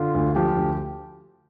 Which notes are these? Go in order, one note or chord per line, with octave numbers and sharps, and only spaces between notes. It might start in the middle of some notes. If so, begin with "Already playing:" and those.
Already playing: D3 F4
D2
F3 G4
D2